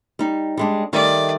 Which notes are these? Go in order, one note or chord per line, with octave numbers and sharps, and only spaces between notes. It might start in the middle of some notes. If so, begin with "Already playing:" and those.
G3 D#4
G3 G#3 D4
D#3 G3 A3 D5